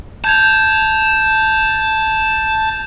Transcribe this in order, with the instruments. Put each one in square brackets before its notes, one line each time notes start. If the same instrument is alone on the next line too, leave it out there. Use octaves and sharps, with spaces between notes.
[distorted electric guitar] A5 [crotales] G6 G#6 F7